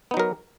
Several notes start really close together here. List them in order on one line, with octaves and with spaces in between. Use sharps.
B3 D#4 F#3 A#4